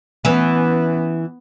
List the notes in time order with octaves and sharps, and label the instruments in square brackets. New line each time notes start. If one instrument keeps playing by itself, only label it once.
[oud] E3 C#4 [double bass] B3